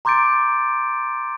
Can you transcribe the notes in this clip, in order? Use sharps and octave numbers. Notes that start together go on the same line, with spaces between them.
A#5 C6 D6 G6 A6 D7